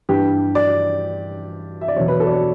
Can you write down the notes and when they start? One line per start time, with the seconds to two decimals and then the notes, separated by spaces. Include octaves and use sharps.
0.09 G2 E3 G4
0.55 D5
1.81 E5
1.88 D5
1.96 E2 B2 F#3 C#5
2.08 B4
2.20 A4
2.27 D5
2.31 C#5